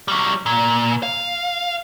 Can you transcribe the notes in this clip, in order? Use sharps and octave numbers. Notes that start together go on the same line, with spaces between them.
F#3 G3
A#2
F5